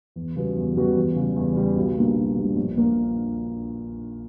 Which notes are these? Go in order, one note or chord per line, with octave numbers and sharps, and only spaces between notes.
E2
C#3 G3 B3 F#4
E2
C#3 G3 B3 F#4
E2
C#3 G3
E2
C#3 G3
B1
A#2 G3 A#3 D4
B1
A#2 G3 A#3 D4
A#1
A#2 A#3